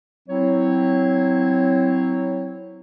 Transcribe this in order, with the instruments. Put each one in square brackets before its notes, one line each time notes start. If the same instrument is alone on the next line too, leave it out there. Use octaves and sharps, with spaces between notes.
[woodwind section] F#3 C4 E4 C#5